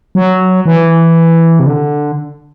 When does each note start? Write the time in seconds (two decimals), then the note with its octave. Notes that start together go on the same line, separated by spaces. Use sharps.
0.15 F#3
0.66 E3
1.59 C3
1.66 D3